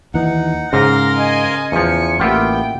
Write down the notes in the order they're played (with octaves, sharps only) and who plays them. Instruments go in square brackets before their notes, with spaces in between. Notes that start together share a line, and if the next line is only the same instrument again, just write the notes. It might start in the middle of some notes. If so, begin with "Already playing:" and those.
[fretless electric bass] D#2 E3 [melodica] D#4 F#5
[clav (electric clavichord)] G#2 [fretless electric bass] C#3 [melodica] A#4 F5 C6 [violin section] A#6
[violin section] D#5 G#5
[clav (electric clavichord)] E2 F3 [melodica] G#5 [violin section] C#7
[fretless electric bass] A1 A#3 [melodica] B3 [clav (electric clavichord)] F4 G4 E5 [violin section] G5